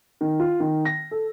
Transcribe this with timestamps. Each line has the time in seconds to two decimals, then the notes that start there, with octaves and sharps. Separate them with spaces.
0.21 D#3
0.40 F4
0.60 D#3
0.85 A#6
1.11 A4